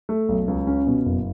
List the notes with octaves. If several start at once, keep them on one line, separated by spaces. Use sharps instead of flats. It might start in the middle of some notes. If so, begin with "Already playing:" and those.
A3
B1
C#2
C#4
B2
F#1